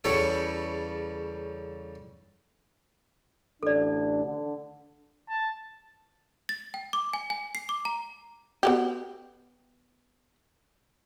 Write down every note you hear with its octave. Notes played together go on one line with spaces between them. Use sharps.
E2 C#3 G3 A4 C#5
A1 D2 D4 A4 D5
D3
A5
A6
G5
D6
G#5
G#5
C7
D6
A#5
B3 F#4 G4